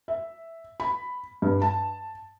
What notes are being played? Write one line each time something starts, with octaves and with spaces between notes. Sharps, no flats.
E5
B5
G2
A5